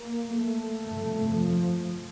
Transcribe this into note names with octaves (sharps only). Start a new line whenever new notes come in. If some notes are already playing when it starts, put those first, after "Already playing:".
Already playing: A#3
A3
G1 F2 C3
F3